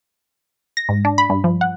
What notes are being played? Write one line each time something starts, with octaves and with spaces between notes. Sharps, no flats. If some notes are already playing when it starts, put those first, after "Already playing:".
A#6
G#2
D4
B5
G2
F3
F#5